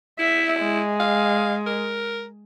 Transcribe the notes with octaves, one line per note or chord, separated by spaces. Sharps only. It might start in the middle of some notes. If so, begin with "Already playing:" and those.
E4 E5
G#3
F5
A#4